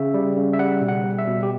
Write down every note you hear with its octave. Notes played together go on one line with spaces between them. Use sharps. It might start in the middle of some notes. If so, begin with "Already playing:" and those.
Already playing: C#3 E5
G3
C#3
E5
G3 F#5
B2
F#5
G3
E5
B2
G4